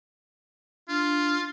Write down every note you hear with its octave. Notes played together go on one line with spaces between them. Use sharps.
D4 F4